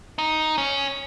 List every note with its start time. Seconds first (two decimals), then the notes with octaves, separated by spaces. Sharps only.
0.19 D#4
0.58 C#4